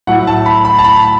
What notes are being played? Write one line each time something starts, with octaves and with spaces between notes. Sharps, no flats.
A2 F#3 A3 E4 F#5
A5
B5
B5
A5
B5